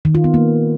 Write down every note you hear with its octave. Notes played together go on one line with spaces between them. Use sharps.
D#3
F4
B3
A#3